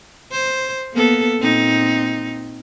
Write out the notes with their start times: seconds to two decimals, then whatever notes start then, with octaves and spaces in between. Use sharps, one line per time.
0.32 C5
0.94 A#3 B3 A4
1.39 A#2 C4 D#4